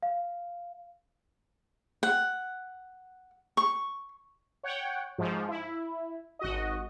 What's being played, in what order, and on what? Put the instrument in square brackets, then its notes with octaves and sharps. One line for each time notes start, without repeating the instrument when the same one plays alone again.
[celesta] F5
[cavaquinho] F#5
C#6
[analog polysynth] C#5 F#5 G5
G#2 F3 G#3
E4
G#1 F#4 D#5